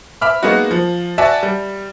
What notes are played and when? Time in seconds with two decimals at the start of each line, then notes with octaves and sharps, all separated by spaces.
0.22 E5 B5 D6 F6
0.43 G#3 A#3 B3 D#4 F#4
0.71 F3
1.18 F#4 D5 E5 G#5 A5
1.43 G3